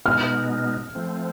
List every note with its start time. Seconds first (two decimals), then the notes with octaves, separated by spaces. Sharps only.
0.06 B2 G#3 B3 D#4 F6
0.95 F3 A3 C4